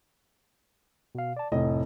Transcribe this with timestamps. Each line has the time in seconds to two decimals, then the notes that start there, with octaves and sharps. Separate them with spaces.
1.15 B2 F5
1.37 D5 A5
1.52 F1 A2 D#5